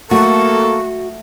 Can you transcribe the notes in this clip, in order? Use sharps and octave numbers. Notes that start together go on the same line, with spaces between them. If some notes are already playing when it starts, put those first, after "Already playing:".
A3 A#3 F#4 A4 C#6